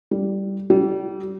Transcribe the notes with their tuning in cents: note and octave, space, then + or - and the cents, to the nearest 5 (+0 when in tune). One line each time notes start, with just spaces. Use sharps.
G3 -5
G3 -35